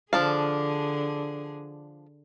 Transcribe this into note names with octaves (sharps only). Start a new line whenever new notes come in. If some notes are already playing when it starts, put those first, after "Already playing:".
D3 F3 D4 G#4 F5